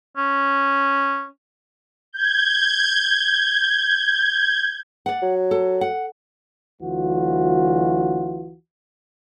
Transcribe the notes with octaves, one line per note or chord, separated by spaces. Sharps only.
C#4
G6 G#6
D5 F#5
F#3
A4
F#5
D2 E3 F#3 F4 F#4